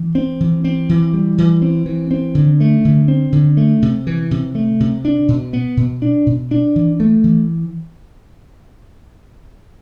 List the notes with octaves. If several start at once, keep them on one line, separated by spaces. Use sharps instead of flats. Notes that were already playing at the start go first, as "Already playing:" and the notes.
Already playing: E3
C4
E3
C4
E3
G3
E3
C4
E3
C4
D3
A3
D3
C4
D3
A3
C3
E3
C3
A3
C3
D4
B2
B3
B2
D4
B2
D4
E3
A3
E3